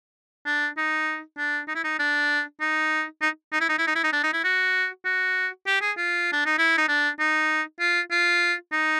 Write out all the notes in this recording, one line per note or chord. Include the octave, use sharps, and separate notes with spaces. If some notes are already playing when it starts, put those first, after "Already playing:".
D4
D#4
D4
D#4
E4
D#4
D4
D#4
D#4
D#4
E4
D#4
E4
D#4
E4
D#4
D4
D#4
E4
F#4
F#4
G4
G#4
F4
D4
D#4
E4
D#4
D4
D#4
F4
F4
D#4